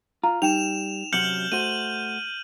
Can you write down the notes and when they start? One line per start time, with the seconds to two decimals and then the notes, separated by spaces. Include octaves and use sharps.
0.23 F4 A#5
0.42 G3 D#4 G5 E7 F7
1.13 F#2 C3 F#3 F6 G6 C#7 F#7
1.52 A3 F#4 C5 D#7